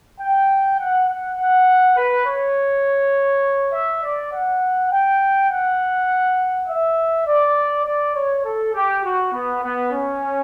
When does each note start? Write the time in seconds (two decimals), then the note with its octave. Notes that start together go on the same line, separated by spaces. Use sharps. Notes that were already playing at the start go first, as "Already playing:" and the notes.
0.20 G5
0.79 F#5
1.09 F#5
1.37 F#5
1.97 B4
2.26 C#5
3.73 E5
4.03 D5
4.32 F#5
4.91 G5
5.50 F#5
6.68 E5
7.27 D5
7.86 D5
8.15 C#5
8.44 A4
8.74 G4
9.03 F#4
9.33 B3
9.62 B3
9.92 C#4